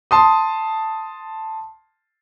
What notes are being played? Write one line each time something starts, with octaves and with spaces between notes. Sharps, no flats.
A5 C6 D#6